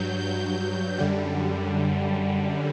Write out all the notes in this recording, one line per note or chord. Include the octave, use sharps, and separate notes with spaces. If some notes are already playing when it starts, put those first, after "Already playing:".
Already playing: G2 F#3 G6
G6
F#2 D3 G3